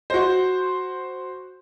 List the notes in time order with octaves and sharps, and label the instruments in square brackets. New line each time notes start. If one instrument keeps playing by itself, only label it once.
[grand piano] F#4 C5